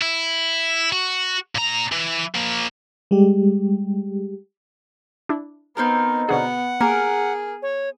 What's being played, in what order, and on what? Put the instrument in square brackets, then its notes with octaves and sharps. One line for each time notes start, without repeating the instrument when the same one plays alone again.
[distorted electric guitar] E4
F#4
A#2 A#5
E3
F3 A#3
[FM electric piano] G3 G#3 G4
[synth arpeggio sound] D4 E4
[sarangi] B3 [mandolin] C4 D#4 A#4
[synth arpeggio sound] B2 D3 G#4 [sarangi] B3 [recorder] F#5
[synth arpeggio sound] A#3 [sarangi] G#4 [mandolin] A#4
[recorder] C#5